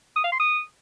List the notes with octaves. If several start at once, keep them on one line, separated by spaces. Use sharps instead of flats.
D#6
F5
C6
D#6